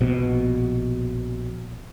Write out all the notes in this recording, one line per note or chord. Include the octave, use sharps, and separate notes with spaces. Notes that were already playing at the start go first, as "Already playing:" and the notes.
A#1 B2